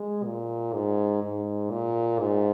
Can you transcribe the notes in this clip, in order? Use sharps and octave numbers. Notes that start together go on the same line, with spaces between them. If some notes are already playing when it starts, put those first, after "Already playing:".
Already playing: G#3
A#2
G#2
G#2
A#2
G#2